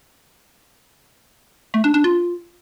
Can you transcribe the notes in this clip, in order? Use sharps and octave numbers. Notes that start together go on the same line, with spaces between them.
A3
D4
D4
F4